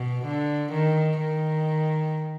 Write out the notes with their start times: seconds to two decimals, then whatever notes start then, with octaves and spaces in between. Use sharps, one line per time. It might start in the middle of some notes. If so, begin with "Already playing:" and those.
Already playing: B2
0.25 D3
0.72 D#3
1.20 D#3